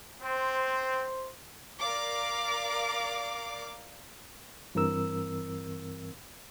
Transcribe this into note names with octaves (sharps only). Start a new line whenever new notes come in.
C4 C5
A#4 D5 F5 D6
G2 E3 C4 A#4 E6